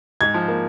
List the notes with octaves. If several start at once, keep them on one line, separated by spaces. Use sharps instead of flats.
G#2 G#6
F3
A#3